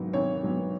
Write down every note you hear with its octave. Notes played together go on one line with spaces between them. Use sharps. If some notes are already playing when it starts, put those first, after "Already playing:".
Already playing: G#1 G#2 F#3 B3
G#1 C#5
G#2 F#3 B3